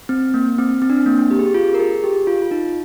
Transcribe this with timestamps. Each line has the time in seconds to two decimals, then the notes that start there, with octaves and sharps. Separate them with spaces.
0.09 C4
0.34 A#3
0.58 C4
0.82 C4
0.90 D4
0.97 C4
1.06 A#3
1.31 G4
1.39 G#4
1.45 G4
1.54 F4
1.74 A#4
1.80 G#4
2.04 G4
2.27 F4
2.42 F4
2.51 D#4